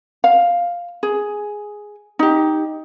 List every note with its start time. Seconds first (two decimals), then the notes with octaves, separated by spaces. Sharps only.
0.24 F5
1.03 G#4
2.19 D#4 G4